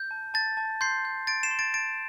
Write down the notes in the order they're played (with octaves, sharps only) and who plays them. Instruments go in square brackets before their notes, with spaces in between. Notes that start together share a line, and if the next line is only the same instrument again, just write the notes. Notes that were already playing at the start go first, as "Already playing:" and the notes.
Already playing: [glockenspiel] G6
A5
A5 A6
A5
C6 G6 C7
G6
C6 A6 D7
C7 E7
C6
A6 D7
A5 A6 D7